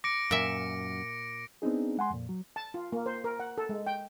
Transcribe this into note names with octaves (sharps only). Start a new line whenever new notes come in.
D6 A#6 C#7 D7
F#2 A#2 E5
B3 C4 D4 D#4 G#4
G#3 F#5 G#5 C6
F2 A#2
F#3
A5
F4
A#3
C5
A#4
F#5
A4
G#3
G5